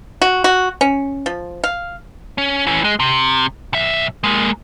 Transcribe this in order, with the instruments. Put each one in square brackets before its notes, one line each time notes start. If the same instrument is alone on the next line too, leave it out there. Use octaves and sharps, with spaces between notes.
[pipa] F#4
F#4
C#4
F3
F5
[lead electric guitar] C#4
E3 C#4
G#3
C3
B1 E5
G#3 A#3